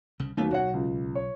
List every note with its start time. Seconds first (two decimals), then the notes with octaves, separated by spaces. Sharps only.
0.19 C2 C#3
0.37 D#2 F#3 A3 B3
0.51 B1 F#4 C#5 F#5
0.74 C#2
1.15 C#5